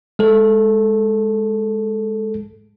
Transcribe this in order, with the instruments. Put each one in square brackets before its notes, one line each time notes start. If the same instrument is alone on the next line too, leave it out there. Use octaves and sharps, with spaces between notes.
[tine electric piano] G#3 A4